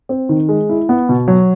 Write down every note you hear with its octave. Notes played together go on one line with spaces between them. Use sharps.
C4
D#3
G#3
E4
B3
B2
F#3